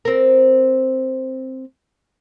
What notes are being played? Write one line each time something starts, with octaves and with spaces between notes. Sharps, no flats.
C4 A#4